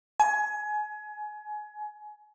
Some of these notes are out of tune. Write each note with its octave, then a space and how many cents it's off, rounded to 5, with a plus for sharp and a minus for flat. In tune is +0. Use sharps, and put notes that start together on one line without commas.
G#5 +25